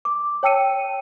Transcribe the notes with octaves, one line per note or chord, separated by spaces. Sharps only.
D6
C#5 G5 A5 E6 C#7 D#7